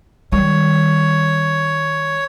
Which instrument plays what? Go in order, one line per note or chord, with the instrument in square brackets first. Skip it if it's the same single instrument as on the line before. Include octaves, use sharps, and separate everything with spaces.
[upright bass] D#3 G3 [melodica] C#5